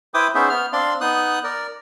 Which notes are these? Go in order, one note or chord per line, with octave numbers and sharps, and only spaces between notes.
E4 B4 C5 G5 D6 D#6
B3 C#4 D#4 G#4 C5 E5
B3 F6
C4 D4 D5 F5 C6
B3 D#4 D#6 F#6
A#4 D5